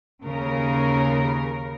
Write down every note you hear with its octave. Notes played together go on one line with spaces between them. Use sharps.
D#2 C#3 A#4